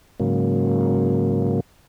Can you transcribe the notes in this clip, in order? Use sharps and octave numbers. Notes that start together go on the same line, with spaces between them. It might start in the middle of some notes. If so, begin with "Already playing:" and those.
G#2 C#3 F#3 A#3